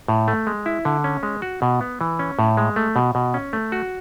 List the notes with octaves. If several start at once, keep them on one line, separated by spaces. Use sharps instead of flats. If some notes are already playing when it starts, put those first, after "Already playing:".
A2
A3
G#3
E4
D3
C#4
G#3
F#4
B2
B3
E3
C#4
A2
G#3
A3
B2
B2
C#4
A3
F#4